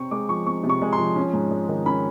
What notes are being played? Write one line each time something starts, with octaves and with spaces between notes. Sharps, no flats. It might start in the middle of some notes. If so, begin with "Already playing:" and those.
Already playing: C3 C4 C#6
G#3 D6
F3 C#6
C4 C#6
C3
C#6
G#3
C6
F3
C#4
G#2
G#3
D#3
C#4 B5